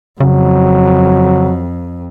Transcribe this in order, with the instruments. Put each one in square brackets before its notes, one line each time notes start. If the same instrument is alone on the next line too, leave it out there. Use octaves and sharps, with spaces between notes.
[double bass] F2 [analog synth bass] C#3 [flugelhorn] F#3